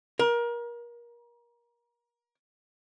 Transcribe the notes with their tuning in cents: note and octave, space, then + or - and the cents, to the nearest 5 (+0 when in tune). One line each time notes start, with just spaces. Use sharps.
A#4 +30